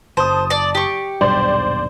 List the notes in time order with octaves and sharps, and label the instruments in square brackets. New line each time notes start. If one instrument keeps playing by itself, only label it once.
[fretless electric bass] F#1 [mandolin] C5 [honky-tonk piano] A5 D#6
[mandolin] D5
G4 C#6
[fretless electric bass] D#1 B1 G2 [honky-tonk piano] C5 D5